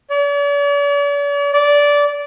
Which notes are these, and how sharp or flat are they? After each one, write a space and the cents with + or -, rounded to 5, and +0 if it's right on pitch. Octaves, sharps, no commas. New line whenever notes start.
D5 -45
D5 -15